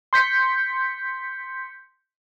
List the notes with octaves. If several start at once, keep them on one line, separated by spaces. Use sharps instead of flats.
C6 G6 B6 C#7